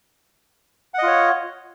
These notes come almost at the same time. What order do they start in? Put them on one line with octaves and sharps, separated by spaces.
F#5 D#5 F4 C#5